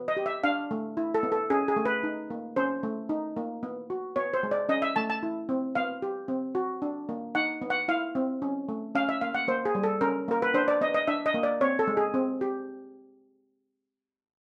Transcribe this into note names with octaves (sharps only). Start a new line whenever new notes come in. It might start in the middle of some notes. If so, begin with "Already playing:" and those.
Already playing: B3
D#5
G4
E5
D4 F5
A3
E4
A4
B3
A4
C#4 G#4
G#4
A3
B4
D#4
A#3
C#4 C5
A3
D#4
A#3
B3
F#4
B3 C#5
C5
G#3
D5
C#4 D#5
E5
A3 A5
A5
E4
C4
B3 F5
G4
C4
F#4
D4
A#3
D#4 F#5
B3
F#5
E4 F5
C4
C#4
A3
C#4 F5
E5
A#3 F5
F#5
A#3 C5
G#4
G3
A4
C#4 A#4
A#3 A#4
B4
D4 C5
D5
B3 D#5
D#5
D4 E5
D#5
A#3
D5
C4 C#5
A4
G#3
G#4
C4
G4